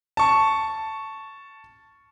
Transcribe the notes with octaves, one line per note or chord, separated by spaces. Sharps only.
A5 C#6